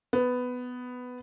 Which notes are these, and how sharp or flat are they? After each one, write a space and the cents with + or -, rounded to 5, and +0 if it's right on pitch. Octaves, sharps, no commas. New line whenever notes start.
B3 +10